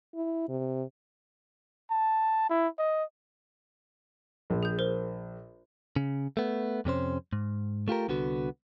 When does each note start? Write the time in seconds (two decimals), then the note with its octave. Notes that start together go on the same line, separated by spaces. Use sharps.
0.15 E4
0.49 C3
1.91 A5
2.50 E4
2.79 D#5
4.50 A#1
4.63 G#4 G6
4.79 A#4 C5
5.96 C#3
6.37 A3 B3
6.85 F2 C3 C#4 C5
7.33 G#2
7.88 A3 F4 G4 A#4
8.08 C2 D3 B3 F#4